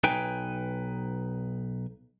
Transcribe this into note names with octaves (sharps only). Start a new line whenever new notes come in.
B1 D#4 B4 G5 G#5